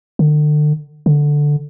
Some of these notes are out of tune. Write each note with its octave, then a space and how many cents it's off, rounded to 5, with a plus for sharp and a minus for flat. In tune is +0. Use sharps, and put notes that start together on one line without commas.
D3 +35
D3 +0